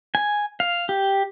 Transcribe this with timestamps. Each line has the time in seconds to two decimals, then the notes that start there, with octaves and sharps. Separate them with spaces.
0.15 G#5
0.60 F5
0.89 G4